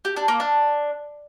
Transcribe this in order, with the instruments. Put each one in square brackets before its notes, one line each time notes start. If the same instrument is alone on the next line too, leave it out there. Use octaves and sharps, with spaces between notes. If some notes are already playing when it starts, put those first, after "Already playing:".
[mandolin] G4
D4
A#3
D4